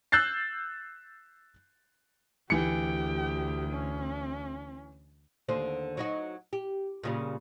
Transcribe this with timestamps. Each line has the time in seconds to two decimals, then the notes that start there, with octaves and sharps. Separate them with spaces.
0.12 E6 F#6 G6 A6 C7
2.50 D2 E3 G4 G5 C#7
3.70 C#4
5.48 D#2 D3 C5
5.97 F#3 D#4 F#4
6.53 G4
7.03 A#2 C#3 G3